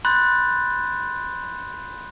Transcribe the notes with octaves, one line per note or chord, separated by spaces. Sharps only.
B5 C6 F#6 G6 A6